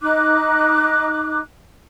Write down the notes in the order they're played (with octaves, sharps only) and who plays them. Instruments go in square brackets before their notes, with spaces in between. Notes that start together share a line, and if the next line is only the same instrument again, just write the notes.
[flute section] D#4 D6 F#6